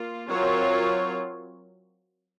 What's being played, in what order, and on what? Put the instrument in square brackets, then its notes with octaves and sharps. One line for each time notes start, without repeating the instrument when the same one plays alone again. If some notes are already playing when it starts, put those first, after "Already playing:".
Already playing: [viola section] A#3 F4
F#3 C4 F4 A#4 C#5